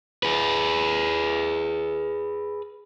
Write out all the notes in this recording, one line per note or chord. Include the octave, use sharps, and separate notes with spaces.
G#4 B4